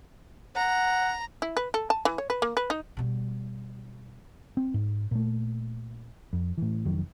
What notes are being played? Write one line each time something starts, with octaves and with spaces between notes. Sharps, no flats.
F#5 A#5
E4
B4
A4
A5
E3
C#5
B4
A#3
B4
D#4
B2 G3
C4
G#2
A#2 A3
F2
A2 E3
F1 F2 D#3 F#3